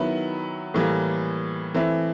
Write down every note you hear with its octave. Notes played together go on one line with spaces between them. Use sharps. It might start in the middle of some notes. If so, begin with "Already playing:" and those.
Already playing: D#3 F#3 B3 E4
A2 E3 G3 A#3
E3 A3 C4 E4